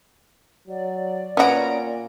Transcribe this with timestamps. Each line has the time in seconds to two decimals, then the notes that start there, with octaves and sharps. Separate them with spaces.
0.68 F#3 D5
1.37 A#2 B3 C#4 F#4 A#5 D7